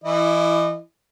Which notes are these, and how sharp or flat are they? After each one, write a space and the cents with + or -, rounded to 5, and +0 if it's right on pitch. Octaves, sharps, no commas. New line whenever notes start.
E3 +20 E4 +0 D#5 -30